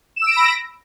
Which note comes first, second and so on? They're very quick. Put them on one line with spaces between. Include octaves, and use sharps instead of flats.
E7 E6 D7 A#6 B5